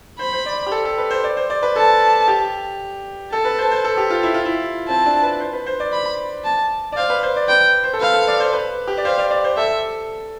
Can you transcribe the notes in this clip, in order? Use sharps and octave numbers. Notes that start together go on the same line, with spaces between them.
C5 B5
C5
D5
G4
A4
A4
B4
C5
D5
C5
D5
B4
A4 A5
G4
A4 A5
B4
C5
C5
A4
G4
F4
E4
F4
E4
C4 A5
D4
B4
C5
B4
C5
D5
B5
A5
D5
C5 F5
B4
C5
D5
B4 G5
C5
A4
B4 F5
A4
D5
C5
B4
G4
D5
C5 F5
D5
D5
C5
A4 E5